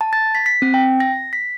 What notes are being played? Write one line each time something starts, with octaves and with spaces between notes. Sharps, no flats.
A5
A6
B6
B6
C4
G5
A#6
B6